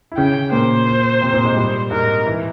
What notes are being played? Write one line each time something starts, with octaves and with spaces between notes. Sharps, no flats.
E4
C#3 C#4 G5
A#2 A#3 C5
C3 C4
A#2 A#3
G#2 G#3
G3
G#2 G#3 A#4
E3 E4